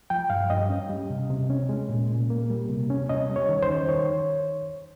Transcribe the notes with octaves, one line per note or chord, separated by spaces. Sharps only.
F3 G5
G2 F5
G2 D#5
C#4
G3
C3
C3
C#4
G#3
A#2
A#2
A#3
G3
C3
C#4
C#4 D#5
G3
C#5
D#3
C5
D#3
D#3 C#5